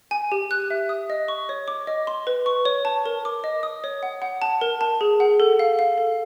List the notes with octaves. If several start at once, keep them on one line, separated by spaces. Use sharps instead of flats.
G#5
G4
F#6
E5
D#6
D#5
C#6
C#5
D6
D#5
C6
B4
C#6
C#5
A5
A#4
D6
D#5
D#6
C#5
F#5
F#5
A5
A#4
A5
G#4
F#5
A4
F5
F5
A4